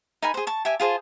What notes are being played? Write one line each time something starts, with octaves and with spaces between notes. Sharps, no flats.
D#4 A#4 G#5 B5
G#4 C5
A5 C#6
G4 E5 G#5
F4 G#4 C5 A5